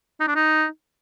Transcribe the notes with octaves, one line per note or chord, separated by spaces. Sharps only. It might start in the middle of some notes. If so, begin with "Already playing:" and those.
D#4
D4
D#4